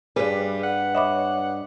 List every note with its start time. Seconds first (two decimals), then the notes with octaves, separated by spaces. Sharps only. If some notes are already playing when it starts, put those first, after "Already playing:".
0.16 G2 G3 G#4 B4
0.63 F#5
0.95 C#5 D#5 E5 B5 D6